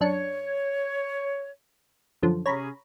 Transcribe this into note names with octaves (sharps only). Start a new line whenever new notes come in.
F#2 D4 C#5 C#7
F#2 D3 F3
C3 C#4 G#4 C#5 A#5 B5